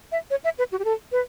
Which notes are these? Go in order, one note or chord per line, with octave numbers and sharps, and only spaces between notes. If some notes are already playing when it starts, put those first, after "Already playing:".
E5
C#5
E5
B4
F#4
G4
A4
B4